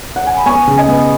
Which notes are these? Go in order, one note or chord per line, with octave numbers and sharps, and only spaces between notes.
F#5
G#5
B5
B3 G#5 C#6
C#3
D#5 G#5
B3